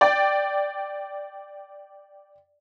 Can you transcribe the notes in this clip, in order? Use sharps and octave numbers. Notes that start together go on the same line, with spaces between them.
D5 G5